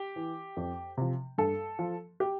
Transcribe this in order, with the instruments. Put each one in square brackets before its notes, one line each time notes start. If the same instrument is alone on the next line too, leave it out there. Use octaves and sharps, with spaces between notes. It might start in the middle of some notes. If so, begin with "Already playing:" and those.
Already playing: [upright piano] G4
E3
F2
C3 F3
G2 A4
F3
G4